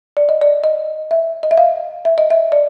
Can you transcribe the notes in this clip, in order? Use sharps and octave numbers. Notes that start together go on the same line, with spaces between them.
D5
D#5
D5
D#5
E5
D#5
E5
F5
E5
D#5
E5
D5